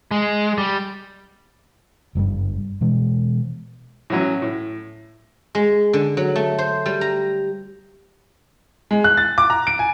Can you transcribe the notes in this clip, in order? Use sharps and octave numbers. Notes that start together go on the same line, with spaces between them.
G#3
G3
F#1 G2 A#2 G3
B2 E3 G#3
A2 E3 F#3 C#4
A2
G#3
D3
F#3
A3
C5
G3
A#5
G#3
F#6
A6
D6
A#5
D7
G#5